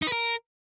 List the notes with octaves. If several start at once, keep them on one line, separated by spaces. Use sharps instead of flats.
D#4
B4
A#4